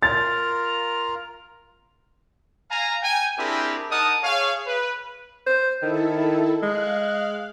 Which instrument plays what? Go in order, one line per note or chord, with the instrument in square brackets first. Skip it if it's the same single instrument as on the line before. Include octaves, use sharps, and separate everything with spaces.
[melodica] F4 A#4 A#5 [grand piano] A6
[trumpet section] F5 G#5 A#5
G5 G#5
C4 D4 E4 G4 G#4 A#4
D#4 A#4 D#5 F#5 A5 D#6
G#4 C#5 F5
B4
[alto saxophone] C5
[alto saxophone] D#3 [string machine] E4 A4
[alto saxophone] G#3 [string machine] F5 F#6